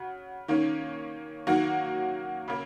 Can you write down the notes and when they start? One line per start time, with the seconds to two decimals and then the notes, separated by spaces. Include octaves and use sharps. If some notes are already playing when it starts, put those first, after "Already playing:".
Already playing: C#3 F#4
0.48 D#3 A#3 C#4
1.47 D#3 F#3 A#3 F#4
2.48 C#3 A#3